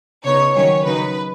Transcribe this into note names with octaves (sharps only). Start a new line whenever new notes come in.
C#3 B3 D#4 C#5
D#3 F#3 C#4 C#5
C#3 F#3 D#4 B4